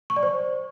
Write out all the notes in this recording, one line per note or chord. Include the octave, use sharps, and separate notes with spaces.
C#6
D5
C5